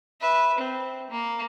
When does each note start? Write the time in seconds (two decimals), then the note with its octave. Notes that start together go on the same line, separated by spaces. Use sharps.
0.21 B4 E5
0.58 C4
1.10 A#3